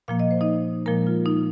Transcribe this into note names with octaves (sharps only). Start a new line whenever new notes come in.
A#2 F3 A#3 F5
D#5
C5
D#4 D#5
A#2 F3 G#3 A#3 A#4
F4
D#4